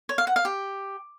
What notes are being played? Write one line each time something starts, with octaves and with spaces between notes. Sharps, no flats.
C#5
F5
F#5
F5
G4